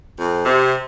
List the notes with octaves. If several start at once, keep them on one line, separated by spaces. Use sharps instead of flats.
F2
C3